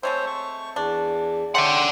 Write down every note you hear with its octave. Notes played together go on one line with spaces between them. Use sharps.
G#3 A3 C4 C5 C#5
C#6
E2 D4
A3 C#4 C#5 D5 F#5 G5 C6